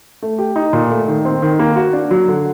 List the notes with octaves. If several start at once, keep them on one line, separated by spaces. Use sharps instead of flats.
A3
G4
D#4
A#2
A3
D#3
C4
D#3
A#3
F#4
D4
F#3
D3